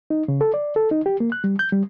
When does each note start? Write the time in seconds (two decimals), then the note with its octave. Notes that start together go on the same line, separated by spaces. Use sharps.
0.10 D#4
0.28 C#3
0.41 A4
0.54 D5
0.76 A4
0.91 D#4
1.06 G4
1.20 A#3
1.32 F#6
1.44 G3
1.59 G6
1.72 G3